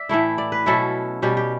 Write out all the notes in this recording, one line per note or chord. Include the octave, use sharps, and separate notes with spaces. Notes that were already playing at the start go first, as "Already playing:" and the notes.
Already playing: D5 E5
A2 E3 A3 E4
D5
B4
B2 F#3 C#4 E4 A4
B2 G3 C#4 G4
G4